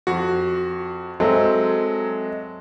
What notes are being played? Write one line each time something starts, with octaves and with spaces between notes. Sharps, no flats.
F2 F#4
F#3 G#3 C4 A4 E5